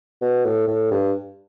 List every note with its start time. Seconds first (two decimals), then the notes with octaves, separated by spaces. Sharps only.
0.21 B2
0.45 A2
0.68 A2
0.91 G2